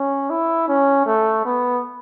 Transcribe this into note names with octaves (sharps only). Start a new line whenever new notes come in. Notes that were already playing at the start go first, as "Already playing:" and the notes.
Already playing: C#4
E4
C#4
A3
B3